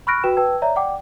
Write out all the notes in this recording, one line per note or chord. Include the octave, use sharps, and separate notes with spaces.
B5 C#6 F6 F#6 A#6 D7
F#4 B4 G5 E7
B4 G5 A5 E6 G#6
C#5 D5 E5 A#5
D5 F#5 G5 D6